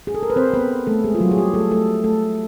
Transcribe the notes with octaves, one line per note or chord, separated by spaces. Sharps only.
G#4
A4
A#4
B4
C4 C5
B3 B4
A3 A4
G#3 G#4
F4
F#3 F#4
G#4
G3 G4
A3 A4
A3 A4
A3 A4